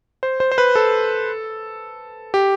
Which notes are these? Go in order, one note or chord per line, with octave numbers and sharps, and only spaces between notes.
C5
C5
C5
B4
A4
G4